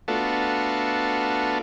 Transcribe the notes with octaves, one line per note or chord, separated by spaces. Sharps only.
A3 B3 D4 F4 F#4 A4